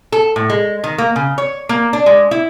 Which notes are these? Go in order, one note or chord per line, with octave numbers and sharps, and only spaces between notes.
A4
A2
G#3
D#3
A#3
C#3
C#5
A#3
D4
G#3
E4